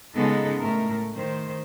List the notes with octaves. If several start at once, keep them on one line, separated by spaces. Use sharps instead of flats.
C#3 G#3 B3 D#4 A4
A2 A3 A#4
D#3 C5